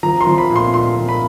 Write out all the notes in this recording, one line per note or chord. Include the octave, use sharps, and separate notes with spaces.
F3 A#5
C6
F3
B5
A#2
C6
A#2 C6
F3
B5